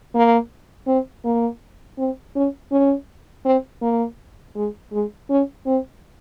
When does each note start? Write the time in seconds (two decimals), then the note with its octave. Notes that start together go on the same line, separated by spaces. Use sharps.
0.15 A#3
0.87 C4
1.25 A#3
1.98 C4
2.36 C#4
2.71 C#4
3.45 C4
3.82 A#3
4.56 G#3
4.92 G#3
5.30 C#4
5.66 C4